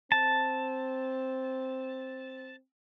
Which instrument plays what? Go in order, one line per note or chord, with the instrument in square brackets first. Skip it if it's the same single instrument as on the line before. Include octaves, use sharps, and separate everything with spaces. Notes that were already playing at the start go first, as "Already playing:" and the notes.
[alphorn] C4 [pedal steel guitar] A5